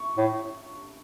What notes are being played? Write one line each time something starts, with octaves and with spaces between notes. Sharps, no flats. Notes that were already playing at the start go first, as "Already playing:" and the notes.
Already playing: C#6
A2